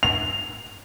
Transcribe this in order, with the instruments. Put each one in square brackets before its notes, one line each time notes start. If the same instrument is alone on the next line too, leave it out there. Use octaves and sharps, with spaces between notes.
[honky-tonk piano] F7